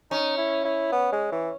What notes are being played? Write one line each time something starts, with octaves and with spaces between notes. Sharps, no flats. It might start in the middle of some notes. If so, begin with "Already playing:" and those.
C#4 D#4
E4
E4
B3
G#3
E3